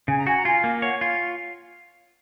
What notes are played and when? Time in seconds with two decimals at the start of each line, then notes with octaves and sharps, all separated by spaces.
0.08 C#3 G#5
0.18 A#5
0.27 F#4 G#5
0.38 A#5
0.45 F4 G#5
0.64 A#3
0.82 C#5 F#5
1.01 F4 F5